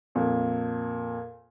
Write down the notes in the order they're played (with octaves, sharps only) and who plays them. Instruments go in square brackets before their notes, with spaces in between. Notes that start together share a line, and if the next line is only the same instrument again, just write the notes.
[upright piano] F2 A#2